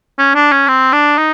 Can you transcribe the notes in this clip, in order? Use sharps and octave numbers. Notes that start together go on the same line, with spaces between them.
C#4
D4
C#4
C4
D4
D#4